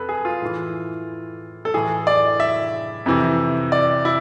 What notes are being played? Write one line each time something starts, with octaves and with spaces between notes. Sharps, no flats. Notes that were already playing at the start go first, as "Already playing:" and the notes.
Already playing: F2 A4 B4
G#4
F4
A2 E3
A4
A2 E3 G#4
D5
E5
F2 C3 E3
D5
E4